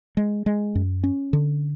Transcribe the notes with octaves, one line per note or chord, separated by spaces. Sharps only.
G#3
G#3
F#2
C#4
D3